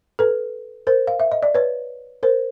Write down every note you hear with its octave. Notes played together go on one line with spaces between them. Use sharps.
A4 B4
A#4 C5
F5
E5
D#5
D5
B4 C#5
A#4 C5